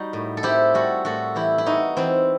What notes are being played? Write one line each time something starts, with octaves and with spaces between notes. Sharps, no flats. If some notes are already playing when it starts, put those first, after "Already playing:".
Already playing: G3 D#4 F#4
A2
A4
C4 E4 G4
G3 F#4 A4
A2 F#4 A4
E3 E4 G4
E4
B3 D#4 F#4
E3 C4 E4